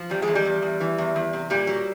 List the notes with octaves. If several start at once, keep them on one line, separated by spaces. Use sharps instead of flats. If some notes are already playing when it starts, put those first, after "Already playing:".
Already playing: F3
E2 G3
G#3
E2
G3
E2
E2
E3
E2
E2
C3
A#2 G3
F#3